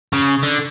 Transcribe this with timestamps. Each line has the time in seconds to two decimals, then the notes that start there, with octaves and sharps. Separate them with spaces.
0.13 C#3
0.43 D3